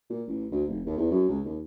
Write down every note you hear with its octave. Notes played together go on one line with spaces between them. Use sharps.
A#2
A1
D2
F1
D#2
E2
F#2
C#2
D#2